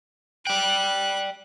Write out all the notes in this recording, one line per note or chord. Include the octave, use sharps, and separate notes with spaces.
D5 G5 F#6